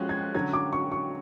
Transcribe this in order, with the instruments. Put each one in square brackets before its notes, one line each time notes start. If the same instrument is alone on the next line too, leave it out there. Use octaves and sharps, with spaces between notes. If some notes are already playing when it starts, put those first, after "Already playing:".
Already playing: [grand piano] F3 G#3 C#4 F#4 [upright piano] F#6
[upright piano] G#6
[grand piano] D3 F#3 C#4 [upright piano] G#6
[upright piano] D6
C#6
C#6